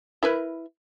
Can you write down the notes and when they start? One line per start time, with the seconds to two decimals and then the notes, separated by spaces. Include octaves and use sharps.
0.23 E4 A#4 B4